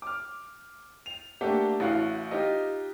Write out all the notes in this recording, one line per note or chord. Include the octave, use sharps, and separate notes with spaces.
D6 F6
F7
A3 A#3 D4 G4 F#5
A1 A2 F#4 F5 F#5 F#6
D#4 F4 G4